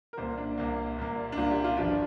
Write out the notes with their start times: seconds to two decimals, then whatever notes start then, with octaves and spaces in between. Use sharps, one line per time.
0.13 A#4
0.17 C2 A#2 A#3 C5
0.37 D4
0.58 C2 A#2 A#3
0.98 C2 A#2 A#3
1.32 D4
1.37 C2 A#2 A#3 F4
1.51 G4
1.64 F4
1.77 G1 G2 F3 D4